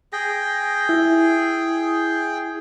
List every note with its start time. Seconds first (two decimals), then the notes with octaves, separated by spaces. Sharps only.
0.13 G#4 G5 A#6
0.89 E4